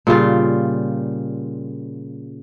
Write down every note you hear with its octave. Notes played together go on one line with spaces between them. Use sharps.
A#2 C#3 G3 F4